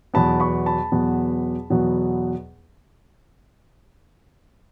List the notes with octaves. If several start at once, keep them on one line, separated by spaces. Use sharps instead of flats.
E2 B2 F#3 B3 A5 B5
B5 C#6
A5 B5
E2 B2 F#3 B3
E2 B2 F#3 B3